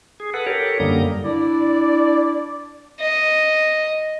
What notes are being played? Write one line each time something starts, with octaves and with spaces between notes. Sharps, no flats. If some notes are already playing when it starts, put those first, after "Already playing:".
G#4
A4 B4 F#5
G4 A4 A#4 C#5
F#2 D3 G3 A#3 A#5 D#6
D4 E4 D5
D#5